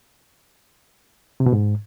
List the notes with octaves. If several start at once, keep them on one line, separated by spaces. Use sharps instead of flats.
C3
B2
G#2